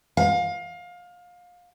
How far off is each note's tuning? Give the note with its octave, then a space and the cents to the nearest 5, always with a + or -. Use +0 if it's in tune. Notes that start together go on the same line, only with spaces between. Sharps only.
F5 +25